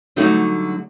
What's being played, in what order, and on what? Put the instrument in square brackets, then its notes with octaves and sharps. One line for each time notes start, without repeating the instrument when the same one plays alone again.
[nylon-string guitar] D3 F#3 G3 A3 D#4 F#4